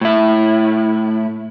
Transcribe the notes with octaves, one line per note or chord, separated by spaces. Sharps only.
A2 E4